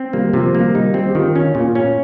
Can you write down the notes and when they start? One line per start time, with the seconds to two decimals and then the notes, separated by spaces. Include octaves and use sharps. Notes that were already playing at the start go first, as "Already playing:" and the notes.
Already playing: C4
0.13 G3 A#3
0.33 C3 F3
0.55 G3 A#3
0.74 G3 D#4
0.94 G3 C4
1.09 G4
1.15 D#3 F4
1.35 C#4 F4
1.55 A#2 F4
1.75 C#4 F4